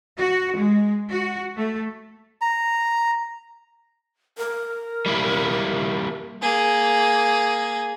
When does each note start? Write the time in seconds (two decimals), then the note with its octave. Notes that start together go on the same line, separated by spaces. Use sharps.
0.17 F#4
0.56 G#3
1.10 F#4
1.56 A3
2.41 A#5
4.38 A#4
5.06 G3 A#3 E4
6.42 A#3 G#4